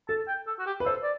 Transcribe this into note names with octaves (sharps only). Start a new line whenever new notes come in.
A4 A5
G5
A4
F#4
G4
B4
A4 C5
D5